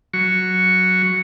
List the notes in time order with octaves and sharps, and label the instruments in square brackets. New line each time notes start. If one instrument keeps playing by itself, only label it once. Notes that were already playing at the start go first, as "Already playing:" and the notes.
[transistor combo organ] F#3 C#6